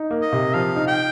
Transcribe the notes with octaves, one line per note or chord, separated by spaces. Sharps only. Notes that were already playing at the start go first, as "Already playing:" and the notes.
Already playing: D#4
A#3
D#5
C3
F3 F5
D#4
G5